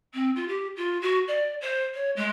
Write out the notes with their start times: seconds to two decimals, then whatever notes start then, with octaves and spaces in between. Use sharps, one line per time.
0.14 C4
0.35 F4
0.48 G4
0.76 F4
1.01 F#4
1.27 D5
1.61 C5
1.94 C#5
2.16 G#3